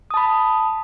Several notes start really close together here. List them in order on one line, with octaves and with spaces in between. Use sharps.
D#6 A5 B5